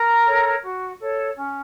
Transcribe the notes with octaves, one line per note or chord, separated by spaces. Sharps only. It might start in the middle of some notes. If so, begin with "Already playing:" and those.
Already playing: A#4 A#5
A4 C#5
F#4
A4 C#5
C#4